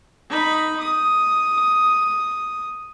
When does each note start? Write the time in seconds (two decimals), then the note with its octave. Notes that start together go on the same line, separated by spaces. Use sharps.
0.29 D#4 B5
0.80 D#6